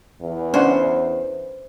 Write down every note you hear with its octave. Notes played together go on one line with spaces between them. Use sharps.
E2
C#4 D4 C5 F#5